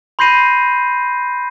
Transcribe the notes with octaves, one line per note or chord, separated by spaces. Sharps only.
B5 C6 G6 A#6 C7 D#7